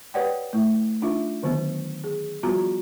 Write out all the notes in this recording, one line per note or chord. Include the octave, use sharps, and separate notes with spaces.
G4 B4 C#5 D5 F#5 G5
A3 E4
D4 D#4 F4 E5
D3 D#3 F#3 B3
G#4
F3 G3 B3 F4 F#4 A#5